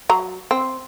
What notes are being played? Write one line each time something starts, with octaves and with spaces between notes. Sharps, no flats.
F#3 A#5
C4